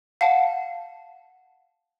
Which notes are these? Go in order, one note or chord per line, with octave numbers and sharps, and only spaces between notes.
F5 F#5 A5